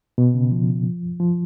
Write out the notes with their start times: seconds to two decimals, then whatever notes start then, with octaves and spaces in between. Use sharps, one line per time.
0.18 B2
0.34 C#3
0.52 F3
1.20 F3